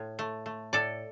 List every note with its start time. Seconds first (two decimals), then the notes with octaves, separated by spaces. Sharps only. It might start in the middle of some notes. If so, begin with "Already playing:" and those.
Already playing: A2
0.19 A3
0.46 A3
0.73 A2 A4 D5